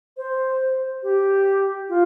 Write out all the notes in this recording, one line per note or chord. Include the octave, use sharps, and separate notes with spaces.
C5
G4
F4